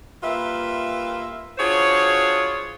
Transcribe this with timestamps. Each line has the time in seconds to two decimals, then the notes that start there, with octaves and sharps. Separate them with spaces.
0.23 G3 A#3 F4 B4 E5
1.58 D4 F4 F#4 G#4 C5 C#5